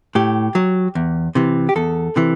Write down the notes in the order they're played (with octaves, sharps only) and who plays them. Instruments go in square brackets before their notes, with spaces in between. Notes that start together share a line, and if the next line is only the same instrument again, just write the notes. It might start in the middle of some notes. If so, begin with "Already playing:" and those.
[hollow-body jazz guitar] A2 G4
F#3
E2
C3 E3
G4
E2 A4
C3 E3